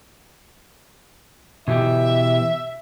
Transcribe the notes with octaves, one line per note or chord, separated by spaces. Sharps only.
B2 E3 G4 E5